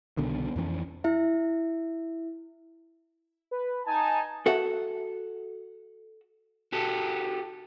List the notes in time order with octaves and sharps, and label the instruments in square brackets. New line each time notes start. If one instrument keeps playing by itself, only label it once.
[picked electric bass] C2 B2 D3 D#3
F2 E3 B3 C#4
[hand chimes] E4 E5
[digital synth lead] B4
[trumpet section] D#4 A5 [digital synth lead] G#5
[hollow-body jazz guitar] F#4 A4 E5 F#5
[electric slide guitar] F#4 G4 A4